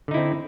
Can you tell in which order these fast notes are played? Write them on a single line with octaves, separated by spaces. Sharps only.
D3 D#4 E4 C4